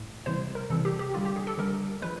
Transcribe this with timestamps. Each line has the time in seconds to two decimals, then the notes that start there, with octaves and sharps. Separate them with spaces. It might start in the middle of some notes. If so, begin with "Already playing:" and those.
Already playing: A2
0.26 C3 E3 G3 C5
0.55 A#4
0.70 C3 E3 G3 A4
0.85 G4
0.99 G4
1.14 D3 G3 F4
1.25 G4
1.36 G#4
1.47 A4
1.58 D3 G3 A#4
2.02 F3 G#3 B4